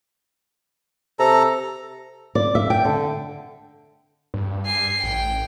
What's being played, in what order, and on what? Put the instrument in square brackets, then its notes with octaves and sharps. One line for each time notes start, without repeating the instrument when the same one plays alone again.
[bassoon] C3 [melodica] A4 A#5
[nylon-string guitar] D5
E5
G5
D3
[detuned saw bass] G2
[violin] G#5 C7
[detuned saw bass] A1 [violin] G5